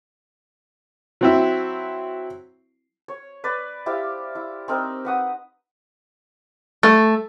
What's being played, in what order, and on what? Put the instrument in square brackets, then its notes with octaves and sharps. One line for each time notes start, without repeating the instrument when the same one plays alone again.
[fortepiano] F#3 C4 E4
[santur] C#5
B4 D5
E4 G4 C5 F5
E4
C4 D#4 A#4 C5
B4 F#5 D#6
[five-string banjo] A3